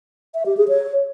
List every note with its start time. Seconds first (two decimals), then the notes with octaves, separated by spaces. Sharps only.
0.35 E5
0.46 G4
0.57 G#4
0.68 C#5